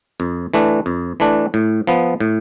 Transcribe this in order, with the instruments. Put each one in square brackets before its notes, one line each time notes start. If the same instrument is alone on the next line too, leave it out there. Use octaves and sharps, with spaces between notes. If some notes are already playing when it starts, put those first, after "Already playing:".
[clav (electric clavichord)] F2
E3 A3 D4
F2
E3 A3 D4
A2
F3 B3
A2